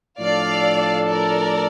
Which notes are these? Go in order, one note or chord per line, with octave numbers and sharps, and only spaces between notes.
A2 F3 A3 D4 A4 D5 F5
A#4 D5